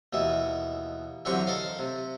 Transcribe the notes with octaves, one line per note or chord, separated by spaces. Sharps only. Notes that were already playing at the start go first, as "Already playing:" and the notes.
D#2 B2 E3 E5
F#2 D3 E3 C4 G4 C#6
A4 A#4 D#5 F5
C3